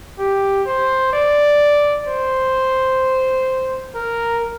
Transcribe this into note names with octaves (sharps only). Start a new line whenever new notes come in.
G4
C5
D5
C5
A#4